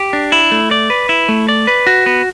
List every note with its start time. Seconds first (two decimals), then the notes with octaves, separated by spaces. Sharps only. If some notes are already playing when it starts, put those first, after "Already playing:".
Already playing: G4
0.13 D4
0.32 E4
0.51 A3
0.71 D5
0.90 B4
1.09 E4
1.29 A3
1.49 D5
1.67 B4
1.87 F#4
2.06 B3